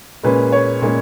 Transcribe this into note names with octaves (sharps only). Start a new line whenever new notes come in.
A#2 G#3 C#4 B4
C#5
A#2 G#3 C#4